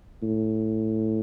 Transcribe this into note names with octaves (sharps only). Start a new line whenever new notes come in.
A2